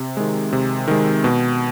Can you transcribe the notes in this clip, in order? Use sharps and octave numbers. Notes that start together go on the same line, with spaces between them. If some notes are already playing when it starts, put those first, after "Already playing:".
Already playing: C3
D#3 G#3
C3
D#3 G#3
B2